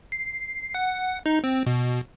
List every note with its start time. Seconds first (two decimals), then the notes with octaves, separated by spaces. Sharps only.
0.12 C7
0.74 F#5
1.26 D#4
1.44 C4
1.66 B2